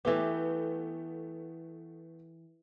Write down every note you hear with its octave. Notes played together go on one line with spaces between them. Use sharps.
E3 A3 B3 G4